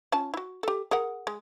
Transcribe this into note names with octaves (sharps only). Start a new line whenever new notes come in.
C#4 F4 A5
E4 F#4
G4 A4
G#4 A#4 F#5
G#3